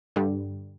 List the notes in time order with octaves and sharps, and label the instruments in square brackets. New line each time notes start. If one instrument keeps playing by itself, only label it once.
[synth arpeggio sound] G2 D3 G3